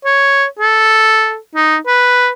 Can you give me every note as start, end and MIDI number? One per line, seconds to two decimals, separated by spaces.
0.05 0.46 73
0.59 1.38 69
1.56 1.77 63
1.87 2.30 71